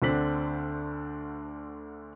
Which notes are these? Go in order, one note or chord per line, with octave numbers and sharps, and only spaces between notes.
D2 D3 C4 D4 B6 F#7